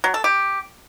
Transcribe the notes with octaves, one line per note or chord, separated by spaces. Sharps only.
F#3
A4
G4